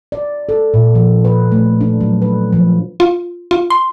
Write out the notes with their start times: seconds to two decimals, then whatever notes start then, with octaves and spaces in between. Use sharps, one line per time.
0.12 D5
0.49 A4
0.74 A#2
0.95 F3
1.25 B4
1.52 A3
1.81 D4
2.01 F#3
2.22 B4
2.53 F3
3.00 F4
3.51 F4
3.70 C6